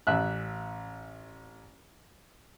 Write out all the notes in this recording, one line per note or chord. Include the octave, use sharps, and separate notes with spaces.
A1 E5 F#6